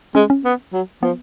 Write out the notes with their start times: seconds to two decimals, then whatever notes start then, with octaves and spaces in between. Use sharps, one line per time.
0.15 G#3 C#4
0.30 C#4
0.45 B3
0.73 F#3
1.03 F3 B3